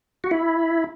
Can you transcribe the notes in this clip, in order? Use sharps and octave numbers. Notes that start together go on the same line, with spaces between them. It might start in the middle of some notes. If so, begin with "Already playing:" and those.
F#4
E4